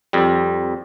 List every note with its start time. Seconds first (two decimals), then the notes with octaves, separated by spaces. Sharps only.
0.13 F2 G3